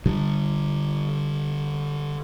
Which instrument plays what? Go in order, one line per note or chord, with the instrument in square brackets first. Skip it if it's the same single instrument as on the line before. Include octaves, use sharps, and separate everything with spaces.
[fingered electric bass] D3 G3